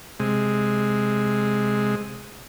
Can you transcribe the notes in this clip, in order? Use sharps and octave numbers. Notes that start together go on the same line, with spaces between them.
C3 G#3